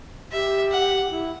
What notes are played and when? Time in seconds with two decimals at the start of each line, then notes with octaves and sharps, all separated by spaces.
0.32 G4 E5
0.72 F#5
1.10 E4